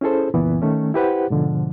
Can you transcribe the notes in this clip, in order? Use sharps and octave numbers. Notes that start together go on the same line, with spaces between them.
C#4 E4 G#4 A4 C5
C#2 F#2 A#2 E3 B3
D#3 A3 C#4
E4 G4 B4 C5 F#5
G#2 B2 D3 F3